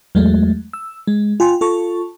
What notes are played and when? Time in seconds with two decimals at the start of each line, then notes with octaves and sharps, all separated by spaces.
0.15 E2 F#3 G#3 A3
0.73 E6
1.08 G#3
1.40 F4 G5 G#5 C6
1.61 F4 A4 A5 C#6